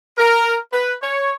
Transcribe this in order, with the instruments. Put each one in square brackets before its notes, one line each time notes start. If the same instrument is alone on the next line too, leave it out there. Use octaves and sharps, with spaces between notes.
[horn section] A#4
B4
C#5